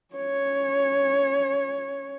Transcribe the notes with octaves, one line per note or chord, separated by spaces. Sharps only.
C#4 C#5